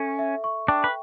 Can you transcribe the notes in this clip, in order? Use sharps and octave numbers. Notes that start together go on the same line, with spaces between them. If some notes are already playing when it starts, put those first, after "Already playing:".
Already playing: C#4 A4 E5 C#6
E5
C#6
D4 G5
B4